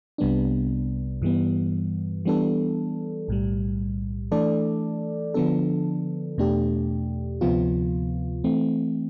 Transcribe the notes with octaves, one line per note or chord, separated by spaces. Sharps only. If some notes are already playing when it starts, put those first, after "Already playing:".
C2 C3 G3 B3 D4
G2 E3 G3 B3
E3 G3 B3 D4 A4
B1 A2 G3
E3 A3 D4 A4 D5
D3 F3 B3 D4 A4
E2 B2 A3 D4 G4
D2 C3 F3 B3 F4
E3 A3 C4